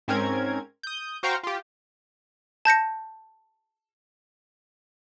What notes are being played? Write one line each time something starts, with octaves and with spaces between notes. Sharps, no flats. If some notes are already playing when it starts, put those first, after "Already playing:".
G#2 C4 C#4 A#4 G#6
D#6 G6
F#4 C5 F5 G5 A#5 C#6
F4 G4
A5 G6 A#6 C#7